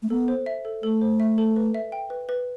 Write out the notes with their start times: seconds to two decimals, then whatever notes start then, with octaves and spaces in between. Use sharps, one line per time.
0.02 A3
0.10 B3 A4
0.28 C5
0.46 E5
0.65 A4
0.83 A3 A4
1.01 C5
1.20 E5
1.38 A4
1.56 B4
1.74 E5
1.92 G5
2.10 B4
2.29 B4